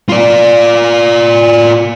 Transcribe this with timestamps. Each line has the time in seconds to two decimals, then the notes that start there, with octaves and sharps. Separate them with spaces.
0.09 F4 D5